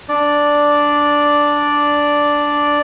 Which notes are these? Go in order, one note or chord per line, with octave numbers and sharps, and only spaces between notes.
D4 D5